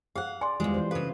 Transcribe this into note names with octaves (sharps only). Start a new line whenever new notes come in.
G#4 F5 F#5
D5 G#5 C6
E2 D#3 E3 G3 G#3 F4
E3 C5
C#3 A4 B4 F5